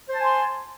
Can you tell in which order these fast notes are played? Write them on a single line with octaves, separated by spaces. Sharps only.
C5 A5 G#5 C6